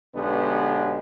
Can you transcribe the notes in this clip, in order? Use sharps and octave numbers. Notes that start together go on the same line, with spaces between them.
B1 D3 G#3 B3 G4